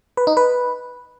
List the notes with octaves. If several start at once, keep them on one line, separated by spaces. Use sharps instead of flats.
B4
D#4
B4